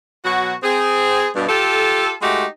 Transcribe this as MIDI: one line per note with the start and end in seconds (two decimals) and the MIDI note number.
0.24 0.53 47
0.24 0.53 54
0.24 0.53 66
0.63 1.27 60
0.63 1.27 68
1.35 1.48 43
1.35 1.48 47
1.48 2.12 65
1.48 2.12 67
1.48 2.12 69
2.21 2.45 56
2.21 2.45 57
2.21 2.45 63
2.21 2.45 66
2.21 2.45 67